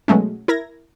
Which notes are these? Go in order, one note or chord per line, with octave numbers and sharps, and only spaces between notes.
B2 F#3 G#3 A3 C#4
E4 A#4 G#6 A#6